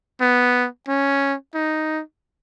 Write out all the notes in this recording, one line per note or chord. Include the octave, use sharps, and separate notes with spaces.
B3
C#4
D#4